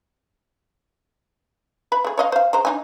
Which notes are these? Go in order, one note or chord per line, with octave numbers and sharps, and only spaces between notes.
B4 E5 B5
A3 G#4
C#5 D#5 F5
C5 F5
G#3 C5 A#5
D4 D#4 G#5